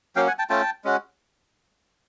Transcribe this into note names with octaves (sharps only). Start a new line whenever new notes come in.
F#3 A#3 C#4 F5 G5
F#5 G#5
G5 A5
A3 C#4 F4 G5 A5
G#3 C#4 F#4